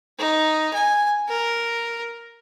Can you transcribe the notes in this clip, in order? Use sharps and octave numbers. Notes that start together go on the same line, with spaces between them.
D#4
G#5
A#4